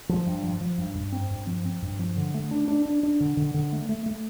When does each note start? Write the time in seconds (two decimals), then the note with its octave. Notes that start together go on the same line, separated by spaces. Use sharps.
0.09 F3
0.26 G2
0.43 F3
0.61 F3
0.78 G2
0.95 G2
1.12 C4
1.30 G2
1.47 F3
1.65 C4
1.82 G2
1.99 F3
2.17 D3
2.34 A3
2.51 D4
2.68 D4
2.85 D4
3.03 D4
3.20 D3
3.37 D3
3.54 D3
3.72 A3
3.89 A3
4.06 A3